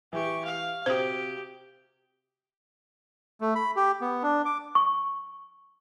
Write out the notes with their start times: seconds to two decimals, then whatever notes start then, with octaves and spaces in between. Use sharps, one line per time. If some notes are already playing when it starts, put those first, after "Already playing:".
0.13 E3 G4 C#6
0.45 F5
0.86 C3 F#4 G4 C5 D#6
3.41 A3
3.55 B5
3.76 G4
4.01 B3
4.23 D4
4.45 D6
4.75 C#6